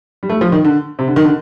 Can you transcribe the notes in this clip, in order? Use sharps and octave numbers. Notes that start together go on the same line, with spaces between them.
G3
A3
F3
D#3
D3
C3
D3
D#3
D3